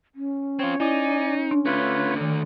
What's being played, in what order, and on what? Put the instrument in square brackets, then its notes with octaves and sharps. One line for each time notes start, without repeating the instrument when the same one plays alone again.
[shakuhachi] C#4
[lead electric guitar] C4 F4 [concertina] C#5
[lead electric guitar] D#4 [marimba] E4 [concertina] D5 G#5
[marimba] D4
[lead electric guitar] D3 A3 [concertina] F4 B4 C#5
[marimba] D#3